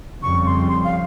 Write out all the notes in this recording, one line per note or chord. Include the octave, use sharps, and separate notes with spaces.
F2 C#3 G3 C#6
C6
C6
F5